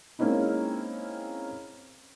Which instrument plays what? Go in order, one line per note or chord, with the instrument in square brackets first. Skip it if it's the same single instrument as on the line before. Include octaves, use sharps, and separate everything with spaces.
[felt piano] G#3 A#3 C4 C#4 D#4 E4